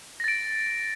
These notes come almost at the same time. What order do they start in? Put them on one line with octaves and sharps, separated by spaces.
A#6 A6 D7